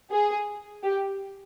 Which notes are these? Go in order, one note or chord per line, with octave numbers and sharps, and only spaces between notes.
G#4
G4